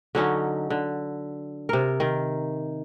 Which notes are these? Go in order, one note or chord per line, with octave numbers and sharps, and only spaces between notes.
D3 F#3 C#4 D#4
D3
C3 A#4
D#3